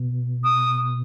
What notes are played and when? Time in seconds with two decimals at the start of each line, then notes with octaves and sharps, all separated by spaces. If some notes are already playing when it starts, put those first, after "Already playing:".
Already playing: B2
0.44 D#6